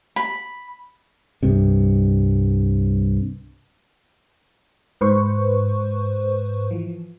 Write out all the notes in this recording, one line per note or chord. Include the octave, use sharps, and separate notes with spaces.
B5
C2 G2 C3
G#2 B4 C5 C#6
E3 F3